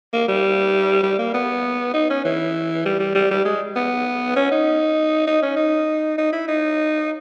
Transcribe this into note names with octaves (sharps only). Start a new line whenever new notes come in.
A#3
G3
G3
A#3
B3
D#4
C#4
E3
G3
G3
G3
G3
G#3
B3
C#4
D#4
D#4
C#4
D#4
D#4
E4
D#4